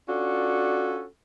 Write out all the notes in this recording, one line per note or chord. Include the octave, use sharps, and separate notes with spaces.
C#4 D4 F4 F#4 A4